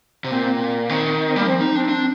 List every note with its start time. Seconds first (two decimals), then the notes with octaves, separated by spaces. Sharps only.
0.24 C3
0.31 A#2 C4
0.89 D#3 C4
1.28 C4
1.36 G3 A#3
1.47 F3 C4
1.61 D#4
1.75 C4 D4
1.89 D4